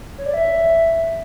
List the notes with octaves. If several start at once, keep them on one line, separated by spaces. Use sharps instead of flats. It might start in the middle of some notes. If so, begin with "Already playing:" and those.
C#5
D5
E5